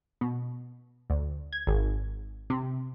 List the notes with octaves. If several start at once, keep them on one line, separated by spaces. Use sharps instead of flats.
B2
D2
G#6
G#1
C3